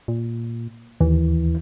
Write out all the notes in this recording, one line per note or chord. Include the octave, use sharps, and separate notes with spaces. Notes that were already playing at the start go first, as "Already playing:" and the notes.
A#2
D#2 E3